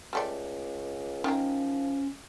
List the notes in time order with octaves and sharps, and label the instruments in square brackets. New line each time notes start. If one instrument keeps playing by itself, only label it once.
[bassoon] C#2 [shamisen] G3 A3 D5
[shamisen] D#3 A#3 [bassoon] F3 [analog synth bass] C#4